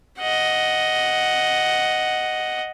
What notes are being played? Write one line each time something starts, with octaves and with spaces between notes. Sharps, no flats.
D#5 F#5